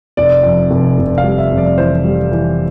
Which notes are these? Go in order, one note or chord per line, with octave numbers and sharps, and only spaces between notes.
F1 D5
F2
F1
F1
F5
G3
E5
F2
D5
E3 C5
G3
E3